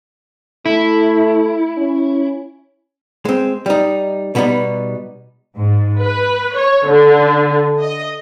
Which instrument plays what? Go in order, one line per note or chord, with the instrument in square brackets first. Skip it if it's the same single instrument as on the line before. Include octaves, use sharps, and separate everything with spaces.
[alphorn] A3 [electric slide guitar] E4
[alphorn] C#4
[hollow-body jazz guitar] G#3 C4
G3 D#4
B2 G3 B3 C4 D#4
[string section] G#2
B4
C#5
D3
D#5